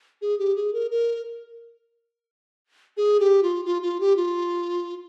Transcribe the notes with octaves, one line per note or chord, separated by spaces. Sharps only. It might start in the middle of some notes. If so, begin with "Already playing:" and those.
G#4
G4
G#4
A#4
A#4
G#4
G4
F4
F4
F4
G4
F4